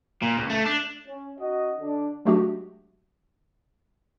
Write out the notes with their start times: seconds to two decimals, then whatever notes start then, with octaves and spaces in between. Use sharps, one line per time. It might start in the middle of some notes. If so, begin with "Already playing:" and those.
0.22 A#2
0.37 C#2
0.50 A3
0.65 D4
1.07 C#4
1.39 C#4 D#4 F#4 D#5
1.79 D3 D4
2.25 F#3 G#3 A3 D4 F#4 G4